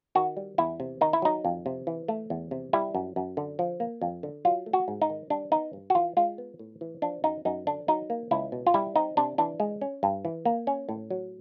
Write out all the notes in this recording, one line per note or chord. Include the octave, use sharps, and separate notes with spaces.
D#3 F#4
G3
E2 E4
C3
D#3 D#4
E4
F#3 D#4
F2
C3
E3
A3
E2
C3
G3 E4
F#2
F#2
D3
F3
A#3
F2
D3
F#3 F4
A3
F#4
G#2
D#4
D#3
G3 D4
B3 D#4
G2
F#4
E3 F4
G#3 F4
B3
A2
E3
F3 D4
F#2 D#4
F#2 D#4
D3 D4
F#3 D#4
A#3
C#2 E4
B2
F4
G3 E4
C4 D#4
C3 D4
E3 D4
G#3
C#4
G2
E3
A#3
C#4
A2
F#3